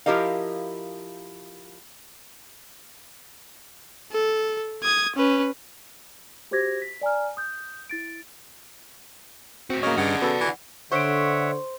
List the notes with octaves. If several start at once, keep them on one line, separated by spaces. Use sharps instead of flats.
F3 E4 G4 A#4 D#5 F5
A4
D#6 G#6
C#4 B4
F#4 G4 C5 D6 G#6 A#6
B6
D5 G#5 A#5 F6
D#6 G6
E4 A6 D7
A2 C4 F#4
C#3 A#3 C#5 D#5 F6
G2 C#3 D5 F#5
B3 F#4 A4
E3
D3 C5 C#5 E5 F#5 C#6 B6 D7